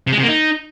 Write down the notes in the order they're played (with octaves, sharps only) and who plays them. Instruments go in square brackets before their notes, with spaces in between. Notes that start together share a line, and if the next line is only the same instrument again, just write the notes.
[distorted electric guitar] C3
G#3
C3
A#3
D#4